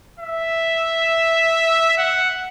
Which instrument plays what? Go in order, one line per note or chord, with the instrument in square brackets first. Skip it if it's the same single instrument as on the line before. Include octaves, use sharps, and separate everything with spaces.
[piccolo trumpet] E5
F#5